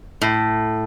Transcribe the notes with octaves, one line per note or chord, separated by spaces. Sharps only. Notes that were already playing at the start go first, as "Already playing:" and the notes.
A2